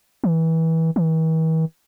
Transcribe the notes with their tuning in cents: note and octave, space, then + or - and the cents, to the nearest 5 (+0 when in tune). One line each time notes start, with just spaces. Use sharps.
E3 -25
E3 -45